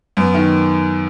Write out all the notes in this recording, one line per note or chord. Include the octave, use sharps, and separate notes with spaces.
F#2 B3
D#3